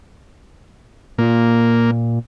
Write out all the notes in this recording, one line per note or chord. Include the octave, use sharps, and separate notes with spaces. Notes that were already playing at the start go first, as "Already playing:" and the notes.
A#2 A#3